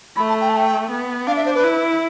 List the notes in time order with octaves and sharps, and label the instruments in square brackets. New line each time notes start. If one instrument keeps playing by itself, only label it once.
[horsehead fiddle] A3 [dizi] B5
[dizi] A5
G5
A5
G5
[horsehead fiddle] B3
[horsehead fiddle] D4 [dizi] F5
[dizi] E5
C5
B4
[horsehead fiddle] E4